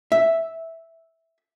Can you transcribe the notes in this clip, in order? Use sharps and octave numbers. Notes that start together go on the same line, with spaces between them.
E5